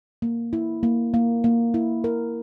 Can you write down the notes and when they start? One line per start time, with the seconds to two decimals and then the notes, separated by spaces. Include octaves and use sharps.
0.22 A#3
0.53 E4
0.83 A#3
1.14 A#3
1.44 A#3
1.74 E4
2.04 A#4